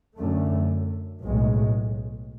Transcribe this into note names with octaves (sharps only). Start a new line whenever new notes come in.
F#2 D3 A3
B1 A2 G#3